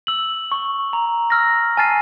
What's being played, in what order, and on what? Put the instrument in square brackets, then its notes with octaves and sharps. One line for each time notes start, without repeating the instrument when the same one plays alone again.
[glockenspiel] E6 F#7
C#6
A#5
E6 F6 A#6
G#5 A5 F6 A6 C7 D#7